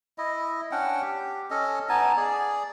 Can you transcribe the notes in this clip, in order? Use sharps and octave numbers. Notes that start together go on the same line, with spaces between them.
E4 D#5
C#4 D4 F#5 G5
G4
C#4 A4 D#5
B3 D#4 G#5 A5
G#4 D5